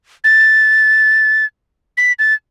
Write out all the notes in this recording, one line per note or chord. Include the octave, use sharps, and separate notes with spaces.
A6
B6
A6